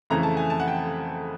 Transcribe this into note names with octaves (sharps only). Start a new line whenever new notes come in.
F2 C#3 E3 A3 A#5
A5
G#5
A5
F#5
G5